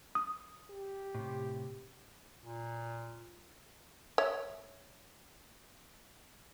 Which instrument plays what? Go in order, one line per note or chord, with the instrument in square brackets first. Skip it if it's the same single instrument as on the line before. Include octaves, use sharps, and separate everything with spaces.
[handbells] D#6
[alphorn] G4
[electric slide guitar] A2 C3
[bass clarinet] A#2
[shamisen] C#5 E5